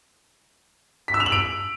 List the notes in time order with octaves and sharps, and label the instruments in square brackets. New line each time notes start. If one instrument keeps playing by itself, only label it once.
[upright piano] B6
E6
F7
F#7
D7